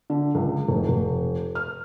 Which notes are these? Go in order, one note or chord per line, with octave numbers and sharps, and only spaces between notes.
D3
C#2
F1
F1
F6